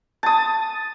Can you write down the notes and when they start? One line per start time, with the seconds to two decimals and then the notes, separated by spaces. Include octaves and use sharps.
0.23 A5 D#6